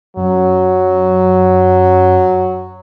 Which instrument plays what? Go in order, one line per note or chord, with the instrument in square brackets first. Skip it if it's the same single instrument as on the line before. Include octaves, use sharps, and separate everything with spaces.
[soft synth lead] F#2 [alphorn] F#3